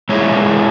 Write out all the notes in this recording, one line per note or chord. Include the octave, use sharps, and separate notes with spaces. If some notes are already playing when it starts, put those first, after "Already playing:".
G#3 B3 E4 G#4 C#5